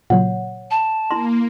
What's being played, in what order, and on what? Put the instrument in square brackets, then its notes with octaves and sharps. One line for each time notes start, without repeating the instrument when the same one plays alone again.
[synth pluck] A#2 C#3 F#3 [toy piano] C#5 F#5
[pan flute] A5
[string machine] A#3 [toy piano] E4 A#5 C6 [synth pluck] A#6